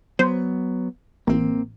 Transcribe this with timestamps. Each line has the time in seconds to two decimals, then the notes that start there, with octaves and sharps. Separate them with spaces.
0.19 F#3 B3 C5
1.27 A1 A#3 C4